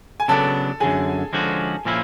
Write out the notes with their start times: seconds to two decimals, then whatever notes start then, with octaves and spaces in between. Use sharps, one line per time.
0.20 G#5
0.28 C#3 F#3 B3 D4 A4 A5
0.80 F#2 D3 F#3 G#4 G#5
1.33 D3 F3 G#3 C#4 F#4
1.85 A#2 F3 A#3 C#4 E4